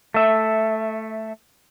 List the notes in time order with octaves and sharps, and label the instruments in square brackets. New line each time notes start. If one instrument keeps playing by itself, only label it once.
[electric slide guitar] A3 E5